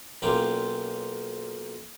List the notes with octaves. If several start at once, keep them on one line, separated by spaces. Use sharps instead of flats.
B1 A#3 C#4 F4 G5 D6